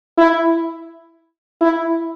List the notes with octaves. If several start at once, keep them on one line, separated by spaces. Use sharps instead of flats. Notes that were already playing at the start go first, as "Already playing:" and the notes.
E4
E4